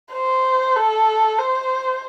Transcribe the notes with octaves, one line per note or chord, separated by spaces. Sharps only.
C5
A4
C5